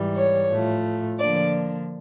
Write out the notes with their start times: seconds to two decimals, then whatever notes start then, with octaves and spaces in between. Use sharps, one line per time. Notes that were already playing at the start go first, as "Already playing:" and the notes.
Already playing: G#2 E3 G3
0.16 C#5
0.50 A2 F3 A3
1.19 D3 F3 A#3 D4 D5